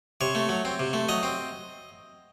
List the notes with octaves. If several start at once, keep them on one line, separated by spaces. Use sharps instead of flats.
C3 C#5
A3
F#3
C4
C3
A3
F#3 D#5
C4